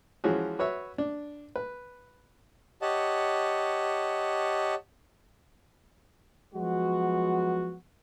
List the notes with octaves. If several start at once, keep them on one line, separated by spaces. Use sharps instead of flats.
E3 F3 G#3 C#4 F#4 G#4
F#4 B4 C#5 E5
D4
B4
G4 C#5 D#5 F#5 A5
F3 F#3 G#3 B3 F#4